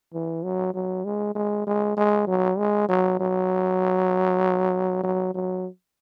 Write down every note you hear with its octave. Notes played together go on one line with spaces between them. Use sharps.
E3
F#3
F#3
G#3
G#3
G#3
G#3
F#3
G#3
F#3
F#3
F#3
F#3